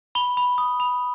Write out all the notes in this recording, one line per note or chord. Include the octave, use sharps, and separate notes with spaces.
B5 G7
B5
D#6
B5